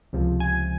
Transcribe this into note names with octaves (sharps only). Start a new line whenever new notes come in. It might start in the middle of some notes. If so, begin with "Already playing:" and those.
C#2 C3 F3
G#5